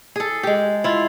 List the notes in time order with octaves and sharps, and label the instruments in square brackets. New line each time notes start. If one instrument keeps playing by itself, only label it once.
[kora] G#4 A4
G#3 G4
E4 F4